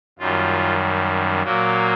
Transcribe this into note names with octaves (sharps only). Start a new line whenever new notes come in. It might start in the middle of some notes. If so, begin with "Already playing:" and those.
F#2 D#3 G3 F4
A#2 F#3 A#3